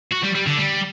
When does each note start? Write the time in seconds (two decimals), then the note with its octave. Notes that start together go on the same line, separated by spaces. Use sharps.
0.12 F#4
0.24 G3
0.35 G3
0.47 D3
0.58 G3